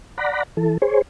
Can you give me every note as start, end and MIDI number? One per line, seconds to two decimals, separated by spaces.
0.18 0.43 74
0.18 0.43 78
0.18 0.43 82
0.18 0.43 83
0.57 0.78 52
0.57 0.78 69
0.82 1.02 68
0.82 1.02 72
0.82 1.02 73